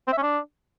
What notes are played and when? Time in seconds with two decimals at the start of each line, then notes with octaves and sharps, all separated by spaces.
0.07 C4
0.12 E5
0.17 C#4
0.23 D4